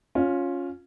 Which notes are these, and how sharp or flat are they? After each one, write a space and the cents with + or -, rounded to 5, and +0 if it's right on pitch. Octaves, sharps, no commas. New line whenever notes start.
C#4 +0 F4 +15